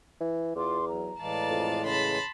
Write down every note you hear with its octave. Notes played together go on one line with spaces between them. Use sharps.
E3
E2 F4 C6 D6
F#3 A#5
A2 E3 G#3 D5 F5 A5
F2
C#3 A5 B5 C6